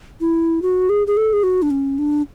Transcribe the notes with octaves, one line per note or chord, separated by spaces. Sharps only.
E4
F#4
G#4
G#4
A4
G#4
F#4
D4
C#4
D4